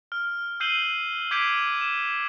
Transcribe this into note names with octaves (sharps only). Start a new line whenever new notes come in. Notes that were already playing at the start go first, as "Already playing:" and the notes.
F6
E6 G6 C7 D#7 F#7 G7
D6 G6 G#6 B6 C7 D7
E7